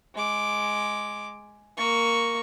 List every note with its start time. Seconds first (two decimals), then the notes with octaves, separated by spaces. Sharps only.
0.15 G#3 D6
1.77 A#3 C#6